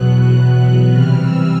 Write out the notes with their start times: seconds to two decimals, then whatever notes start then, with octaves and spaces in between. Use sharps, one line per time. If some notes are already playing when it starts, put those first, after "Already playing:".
Already playing: E2 B2 F#3 B3 F#6
0.92 C3 E3 G3 F6
1.21 E6